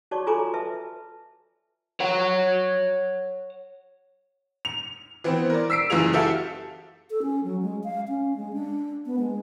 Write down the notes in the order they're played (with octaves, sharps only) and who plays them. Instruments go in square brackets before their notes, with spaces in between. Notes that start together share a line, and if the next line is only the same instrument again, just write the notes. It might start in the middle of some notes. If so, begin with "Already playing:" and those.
[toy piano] F#4 C#5 D5 A5 C#6 D6
F4 A4 G#5 A#5 C6 D6
B4 E5 A5
[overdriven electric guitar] C#5 F#5
[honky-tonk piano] F7
E3 B3 C4
A#4 D5
E6 B6 C7 D7
F#1 E3 F4 G#4 F7
F#4 G4 A4 E5 F5
[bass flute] A4
C#4
F#3
G#3
F5
C#4
G#3
D4
B3
G#3